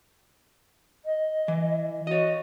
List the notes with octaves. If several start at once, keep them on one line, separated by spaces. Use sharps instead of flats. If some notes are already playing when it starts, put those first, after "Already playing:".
D#5
E3
F#4 C#5 D#5